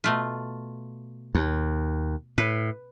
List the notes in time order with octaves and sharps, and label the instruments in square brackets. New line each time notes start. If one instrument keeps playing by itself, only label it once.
[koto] B2 A3 F4
[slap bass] D#2
[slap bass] A2 [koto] B4